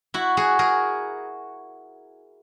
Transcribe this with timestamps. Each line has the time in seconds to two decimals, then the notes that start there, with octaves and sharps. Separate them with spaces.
0.14 E4 F#4
0.37 F#4 G#4
0.59 G#4 A#4